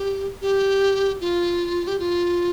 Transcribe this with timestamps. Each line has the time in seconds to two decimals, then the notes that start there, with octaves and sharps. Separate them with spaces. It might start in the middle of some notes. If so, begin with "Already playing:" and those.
Already playing: G4
0.42 G4
1.21 F4
1.87 G4
1.99 F4